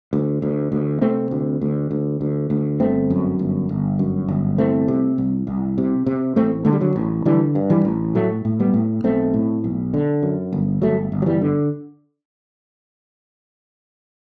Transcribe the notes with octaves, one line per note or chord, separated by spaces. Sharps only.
D2
D2
D2
C3 A3 C4
D2
D2
D2
D2
D2
G1 A3 C4
F#2
G1
G1
F#2
G1
C2 A3 C4
C3
C2
C2
C3
C3
A1 A3 C4
D3 A3
G3
D3 F#3
A1
D3 E3 G3
G2
E3 G3
A1
A2 F#3 A3
A2
G3 B3
A2
B1 A3 C4
A2
B1
D3
F#2
G1
G1 F#3 A3
G1
F#3
E3 G3
D3